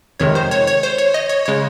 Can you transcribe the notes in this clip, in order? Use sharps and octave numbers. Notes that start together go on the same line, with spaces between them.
F2 C3 D#3 G#3 C#5
C5
C#5
C#5
C5
C#5
D#5
C#5
C#3 G#3 C#5